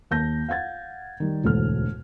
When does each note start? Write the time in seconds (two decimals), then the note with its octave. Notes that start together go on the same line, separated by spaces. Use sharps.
0.11 D#2 A5 G6 A#6
0.49 F5 F#5 G#6 A6
1.20 D#3 G3
1.44 E1 D2 G#2 E3 A4 F6